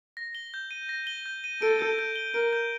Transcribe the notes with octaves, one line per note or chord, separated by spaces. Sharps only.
A#6
G7
G6
D#7
A#6
G7
G6
D#7
A4 D7
G6
G6
G7
A#4 D7
G6